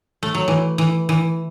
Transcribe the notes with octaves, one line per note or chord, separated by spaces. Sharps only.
A3
F#3
E3
E3
E3